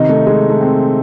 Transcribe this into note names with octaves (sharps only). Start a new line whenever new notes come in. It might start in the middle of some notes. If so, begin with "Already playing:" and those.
Already playing: C3 D#3 D#4
A3
G#3
A3
C4